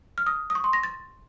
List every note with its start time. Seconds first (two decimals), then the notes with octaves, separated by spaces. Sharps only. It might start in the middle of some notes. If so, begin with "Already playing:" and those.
0.18 F6
0.27 D#6
0.50 D#6
0.55 C#6
0.64 C6
0.73 A#6
0.83 A6